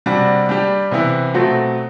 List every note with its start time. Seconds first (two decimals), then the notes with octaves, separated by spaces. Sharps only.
0.06 C3 G3 D4 F#4
0.49 G3 D4 G4
0.91 C3 E3 B3 E4
1.34 B2 F#3 A3 C4 F#4